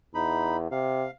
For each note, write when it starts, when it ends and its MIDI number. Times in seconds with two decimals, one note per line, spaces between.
0.14 0.69 40
0.14 0.57 63
0.14 0.57 83
0.71 1.06 48
0.71 1.11 77